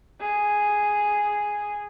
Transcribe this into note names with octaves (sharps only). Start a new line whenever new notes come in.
G#4